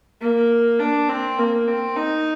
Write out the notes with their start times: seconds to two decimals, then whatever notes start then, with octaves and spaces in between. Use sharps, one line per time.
0.21 A#3
0.79 D4
1.09 C4
1.39 A#3
1.67 C4
1.97 D#4